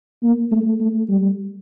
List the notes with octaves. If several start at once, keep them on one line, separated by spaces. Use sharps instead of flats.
A#3
A3
A3
G3